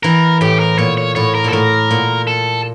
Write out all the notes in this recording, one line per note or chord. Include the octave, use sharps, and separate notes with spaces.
E3 A#4
A2 G4
A#4
A#2 C#5
C#5
A2 C#5
A#4
A#2 A4
A2 A#4
A#2
A4